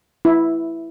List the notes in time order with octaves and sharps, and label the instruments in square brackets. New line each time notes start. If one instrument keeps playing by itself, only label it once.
[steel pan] E4